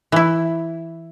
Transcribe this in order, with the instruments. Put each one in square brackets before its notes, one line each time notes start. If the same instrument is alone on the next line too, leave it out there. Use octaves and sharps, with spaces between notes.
[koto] E3 E4